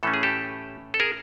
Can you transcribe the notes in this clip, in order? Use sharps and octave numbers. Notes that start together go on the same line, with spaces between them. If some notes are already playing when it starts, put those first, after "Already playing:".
A2 E3 A3 C#4 A4
G#4
G4 A4
A4
G#4 A#4